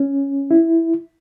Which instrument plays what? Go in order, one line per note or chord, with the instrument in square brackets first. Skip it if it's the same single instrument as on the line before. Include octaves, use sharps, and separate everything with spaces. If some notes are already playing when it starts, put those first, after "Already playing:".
Already playing: [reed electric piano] C#4
E4